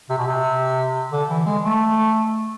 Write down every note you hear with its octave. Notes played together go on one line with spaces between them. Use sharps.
C3
B2
C3
D3
E3
G#3
A3